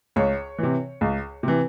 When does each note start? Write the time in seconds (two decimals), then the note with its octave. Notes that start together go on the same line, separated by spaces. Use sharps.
0.16 C#2 C#5
0.58 C3 E3
1.01 C#2
1.43 C3 E3